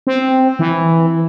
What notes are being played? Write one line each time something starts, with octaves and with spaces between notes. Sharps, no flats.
C4
E3